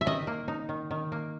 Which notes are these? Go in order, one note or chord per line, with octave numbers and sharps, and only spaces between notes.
E5
D#3 D#5
A#3
D#4
D#3
D#3
A#3